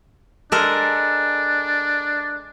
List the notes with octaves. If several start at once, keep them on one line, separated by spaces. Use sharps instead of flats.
G#3 D4 A4 A#4